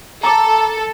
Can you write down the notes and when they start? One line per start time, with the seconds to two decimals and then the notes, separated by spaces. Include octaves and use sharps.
0.23 A4 A#5 D6